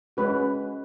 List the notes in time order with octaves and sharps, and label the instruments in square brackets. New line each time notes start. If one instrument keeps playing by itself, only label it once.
[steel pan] G#3 C#4 F#4 B4